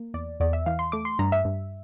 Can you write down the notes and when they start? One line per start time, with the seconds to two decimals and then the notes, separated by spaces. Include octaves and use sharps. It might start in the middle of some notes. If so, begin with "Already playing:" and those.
Already playing: A#3
0.14 E2 D5
0.40 E2 D5
0.53 E5
0.66 E3 F5
0.79 C6
0.92 A3 D6
1.05 C6
1.19 G2 A#5
1.32 E5
1.45 G2